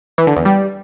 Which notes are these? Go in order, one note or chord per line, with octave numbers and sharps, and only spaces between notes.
E3
D3
E2
G3